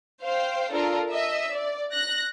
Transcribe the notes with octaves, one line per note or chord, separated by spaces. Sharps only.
C5 F5 G5
D4 F4 A4 A#4
D#5 E5
D5
F#6 A#6